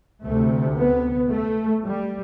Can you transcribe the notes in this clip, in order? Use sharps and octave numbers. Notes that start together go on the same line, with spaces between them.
D2 C3 A3
B3
A3
G3